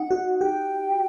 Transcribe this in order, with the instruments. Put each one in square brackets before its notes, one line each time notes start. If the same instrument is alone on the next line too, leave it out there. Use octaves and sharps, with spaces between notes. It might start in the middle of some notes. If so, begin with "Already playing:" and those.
Already playing: [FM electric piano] D#4 [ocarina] F#5
[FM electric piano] F#4
[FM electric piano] G4 [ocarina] G5